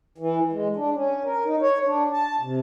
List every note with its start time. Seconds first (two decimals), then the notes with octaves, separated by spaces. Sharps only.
0.18 E3
0.53 G#3
0.76 D4
0.94 C#4
1.25 A#4
1.45 D#4
1.61 C#5
1.85 D4
2.13 A5
2.41 C3